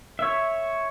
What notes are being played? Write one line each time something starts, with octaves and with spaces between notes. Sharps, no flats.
C#5 E5